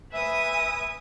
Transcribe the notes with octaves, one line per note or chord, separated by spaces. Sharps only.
B4 E5 G#5 D#6